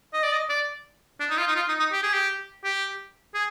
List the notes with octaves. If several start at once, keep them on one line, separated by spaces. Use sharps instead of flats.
D#5
D5
D#5
D5
D4
D#4
F4
D#4
F4
D#4
D#4
G4
G#4
G4
G4
G#4